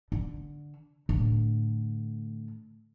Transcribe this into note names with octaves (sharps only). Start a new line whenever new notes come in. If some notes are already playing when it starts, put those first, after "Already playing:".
D3
A2 D3